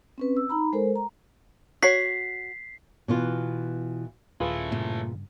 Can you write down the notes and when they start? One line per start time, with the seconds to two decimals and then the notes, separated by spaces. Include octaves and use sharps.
0.18 C4 C#4 B4
0.37 E6
0.50 D#4 A#5 B5
0.73 G#3 A4 A#4 C5
0.96 A#5
1.83 F#4 C#5 B6 C7
3.08 B2 E3 F4
4.40 D#1 E3 A3 F4 G#4 B4
4.72 G2 A#2 C#3